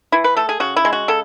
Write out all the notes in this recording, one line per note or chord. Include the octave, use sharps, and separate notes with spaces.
E3 E4
B4
A3 A4
G#4
C#3 F#4
E4
G#3
F#4
C#3 A4